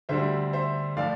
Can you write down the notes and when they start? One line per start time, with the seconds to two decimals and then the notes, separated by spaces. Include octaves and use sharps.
0.09 D2 D3 G3 C5 E5
0.53 C5 E5
0.97 A2 F3 D5 F5